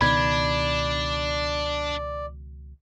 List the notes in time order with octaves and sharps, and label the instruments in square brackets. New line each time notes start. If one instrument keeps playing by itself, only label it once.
[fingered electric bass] C#2 B2 D#3 [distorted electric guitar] D4 [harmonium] D5 [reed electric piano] B5 G#6